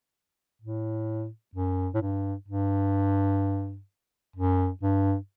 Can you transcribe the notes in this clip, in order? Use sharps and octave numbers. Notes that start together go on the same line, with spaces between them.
A2
F#2
A2
G2
G2
F#2
G2